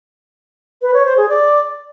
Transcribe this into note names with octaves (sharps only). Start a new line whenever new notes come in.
B4
C#5
C5
G#4
D5